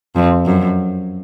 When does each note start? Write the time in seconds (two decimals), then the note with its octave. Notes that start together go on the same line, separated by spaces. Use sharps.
0.16 F2
0.46 F#2